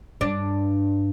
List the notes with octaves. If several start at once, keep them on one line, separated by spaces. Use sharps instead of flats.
G2 D4